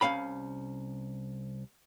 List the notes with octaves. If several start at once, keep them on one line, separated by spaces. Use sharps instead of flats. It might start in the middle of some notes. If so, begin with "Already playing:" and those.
C2 G#3 C#4 F5 B5